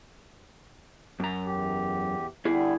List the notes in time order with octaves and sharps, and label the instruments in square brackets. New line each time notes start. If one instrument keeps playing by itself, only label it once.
[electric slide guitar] F#2 A#5
[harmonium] E2 G4
[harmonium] D3 G3 [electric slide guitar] E4 G#4